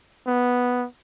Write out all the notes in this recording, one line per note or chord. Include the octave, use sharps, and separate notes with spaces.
B3